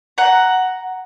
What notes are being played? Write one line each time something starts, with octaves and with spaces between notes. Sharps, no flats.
F#5 A#5